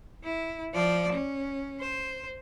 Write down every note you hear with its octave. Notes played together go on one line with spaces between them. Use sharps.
E4
F3 D5
C#4
C5